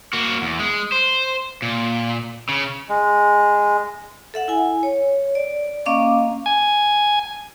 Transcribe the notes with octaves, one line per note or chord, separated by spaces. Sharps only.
A#3 F#4
E2
G#3
C5
A#2
C#3
G#3
A4 E5 F#5
E4 G#5
C#5
D5
A#3 C#4 D#5 F5 C#6 D6
G#5